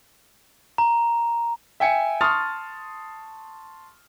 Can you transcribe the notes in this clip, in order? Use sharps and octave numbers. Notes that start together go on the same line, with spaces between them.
A#5
E5 G5 G#5 C#7
A5 C6 C#6 D#6 F6 A6